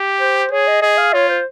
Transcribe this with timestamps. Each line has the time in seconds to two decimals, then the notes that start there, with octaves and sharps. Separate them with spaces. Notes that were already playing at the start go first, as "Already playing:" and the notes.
Already playing: G4
0.20 C5
0.52 G#4 C#5
0.67 D#5
0.82 G#4 D#5
0.98 F5
1.14 F4 C#5
1.29 C5